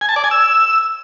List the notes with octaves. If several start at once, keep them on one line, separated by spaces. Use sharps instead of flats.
G#5
A5
D5
G#5
E6